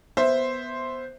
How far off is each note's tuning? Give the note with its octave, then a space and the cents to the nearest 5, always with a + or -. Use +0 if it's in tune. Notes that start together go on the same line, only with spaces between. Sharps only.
B3 +0 C5 +0 E5 +0